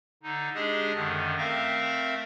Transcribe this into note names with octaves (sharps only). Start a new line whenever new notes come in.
D3 D#4
G#3 D4 G4 G#4 D#5
F#2 D3 D#3
A3 C4 A#4 E5 F5 A#6